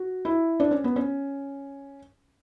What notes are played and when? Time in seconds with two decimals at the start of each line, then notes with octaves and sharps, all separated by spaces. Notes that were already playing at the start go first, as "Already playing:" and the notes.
Already playing: F#4
0.25 E4
0.60 D4
0.71 C#4
0.84 B3
0.96 C#4